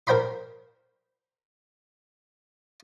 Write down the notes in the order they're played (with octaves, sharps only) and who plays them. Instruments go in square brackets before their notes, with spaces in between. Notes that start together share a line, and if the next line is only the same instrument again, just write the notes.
[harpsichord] A#4 C5 G5 B5 C6